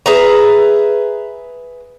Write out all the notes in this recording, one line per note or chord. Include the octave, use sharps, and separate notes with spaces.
G#4 B4 E5 A#5